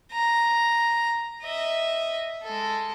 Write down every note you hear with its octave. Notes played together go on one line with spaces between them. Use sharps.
A#5
D#5 E5
G#3 A4